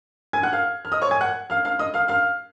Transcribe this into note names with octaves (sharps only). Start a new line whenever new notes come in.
G#5 G#6
F#5 F#6
F5 F6
F6
D#5 D#6
C#5 C#6
G#5 G#6
F#5 F#6
F5 F6
F5 F6
D#5 D#6
F5 F6
F5 F6